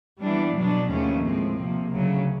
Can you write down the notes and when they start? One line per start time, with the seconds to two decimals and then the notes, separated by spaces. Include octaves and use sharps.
0.22 E3 G3 B3 D4
0.56 B2 F#3 B3 D4
0.90 D#2 C#3 F3 A3 C#4
1.23 A2 F3 G#3 C4
1.57 C3 F3 A#3
1.91 D2 C#3 F#3